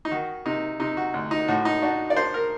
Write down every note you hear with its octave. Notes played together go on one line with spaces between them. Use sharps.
D#4
D#3 F#4
C3 D#4
C3 D#4
F#4
D2
D#4
A2 F#4
D#4
D4 F#4
D5
D4 C5
A#4